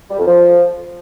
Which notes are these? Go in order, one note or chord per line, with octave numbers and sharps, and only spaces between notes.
G3
F2
F3